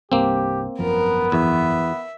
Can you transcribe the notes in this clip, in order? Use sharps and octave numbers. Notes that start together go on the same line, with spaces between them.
C2 G2 A#3 C4 G4
G#1 F#2 F3 B3 A#4
E2 E5